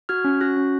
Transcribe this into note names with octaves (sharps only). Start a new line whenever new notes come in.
F#4 F6 G#6
C#4
F#4 F#6 A#6
C#4